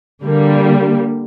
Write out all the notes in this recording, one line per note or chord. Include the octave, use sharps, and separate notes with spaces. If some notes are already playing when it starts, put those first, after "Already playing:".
D3 G3 A#3